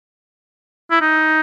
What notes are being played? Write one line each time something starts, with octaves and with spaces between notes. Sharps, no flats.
E4
D#4